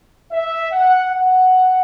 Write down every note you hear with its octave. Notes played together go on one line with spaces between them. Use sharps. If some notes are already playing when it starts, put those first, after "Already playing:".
E5
F#5
F#5